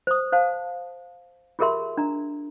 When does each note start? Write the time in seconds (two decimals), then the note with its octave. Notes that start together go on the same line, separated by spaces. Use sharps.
0.07 C5 D#6
0.32 C5 F5 A5
1.59 F4 G4 G#4 A#4 E5 C6
1.97 D4 A#5